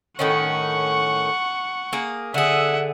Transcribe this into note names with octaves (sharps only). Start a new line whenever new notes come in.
A2 D#3 C#4 F#5 C#6
A#3 G#4
D3 G#4 E5 F#5